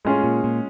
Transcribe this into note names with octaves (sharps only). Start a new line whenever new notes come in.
A2 G#3 C#4 F4 G#4
A#2
A#2